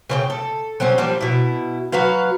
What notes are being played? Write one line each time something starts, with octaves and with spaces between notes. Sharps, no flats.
C#3 C5 G5
A4
F#3 G3 C4 C#4
F3 G3 A#3 D4
B2 E4
F#3 F#4 B4 F5